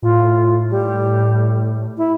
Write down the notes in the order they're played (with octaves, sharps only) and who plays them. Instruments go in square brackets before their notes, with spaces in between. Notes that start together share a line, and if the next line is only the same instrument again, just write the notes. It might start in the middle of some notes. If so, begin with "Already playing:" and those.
[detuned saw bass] A2 [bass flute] F4
[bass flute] G3
E4